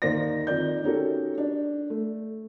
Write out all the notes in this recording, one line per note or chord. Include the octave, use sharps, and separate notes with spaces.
D#2 D#3 C5 D5 A#6
F2 D#3 D5 G6
C#4 D#4 F#4 G4 A4 A#4
D4
A3